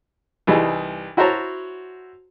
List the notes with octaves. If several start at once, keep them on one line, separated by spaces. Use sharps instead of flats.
C2 E3 G3 D#4 G#4
E4 F#4 C5 C#5 A5 A#5